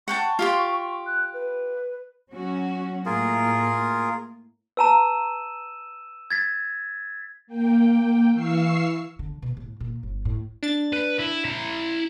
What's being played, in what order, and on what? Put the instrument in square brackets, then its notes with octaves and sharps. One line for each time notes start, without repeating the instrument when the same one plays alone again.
[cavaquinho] F#5 G5 A5 [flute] C#6
[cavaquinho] F4 G4 C6
[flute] F#6
B4
[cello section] F#3 C#4 F#4
[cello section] A2 A#3 [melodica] F4 G#4 A#4
[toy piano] B4 A5 A#5 [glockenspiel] E6 D#7 E7
[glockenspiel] G#6 A6 B6
[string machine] A#3 G5
E3 F5 C#6 E6 C7
[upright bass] D3
B2
A2
A#2
G1
A2
[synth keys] D4 A6
[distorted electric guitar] B4
E4
E4 A#5